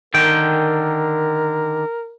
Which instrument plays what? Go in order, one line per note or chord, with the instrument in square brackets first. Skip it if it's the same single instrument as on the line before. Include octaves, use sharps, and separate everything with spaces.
[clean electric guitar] D3 D#3 G5 [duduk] A#4